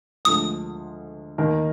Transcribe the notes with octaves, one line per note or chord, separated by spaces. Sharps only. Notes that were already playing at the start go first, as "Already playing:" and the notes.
D2 D3 F3 G#3 D#6
D#2 D#3 A#3 D#4 A#4